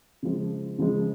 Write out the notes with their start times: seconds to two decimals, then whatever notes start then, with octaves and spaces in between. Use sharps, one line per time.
0.23 C#3 F3 G#3
0.79 C#3 F3 G#3